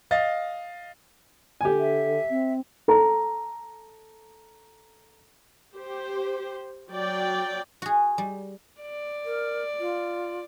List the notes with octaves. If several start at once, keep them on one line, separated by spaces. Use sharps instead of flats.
D#5 F5 A6
D3 G4 G#5
E5
C4
A4 A#5
G4 C5
F#3 D5 G5
F#4 G#4
G3
D5
A#4
F4